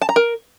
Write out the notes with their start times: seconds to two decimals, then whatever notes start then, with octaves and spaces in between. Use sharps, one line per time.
0.02 A5
0.09 A#5
0.16 A#4